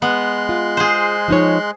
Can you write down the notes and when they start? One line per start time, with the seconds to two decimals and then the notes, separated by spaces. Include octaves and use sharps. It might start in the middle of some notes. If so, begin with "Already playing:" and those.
0.02 G#3 B3 C6 F#6
0.49 F4
0.77 G#4 C5
1.28 F3 D#4 C#5